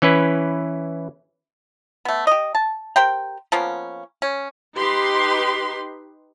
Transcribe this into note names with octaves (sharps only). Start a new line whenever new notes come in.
E3 C#4 E4 B4
A3 B3
G4 D#5
A5
G4 A#4 C5 G5
F3 A#3 B3 C#4
C#4
D#4 G4 B4 C6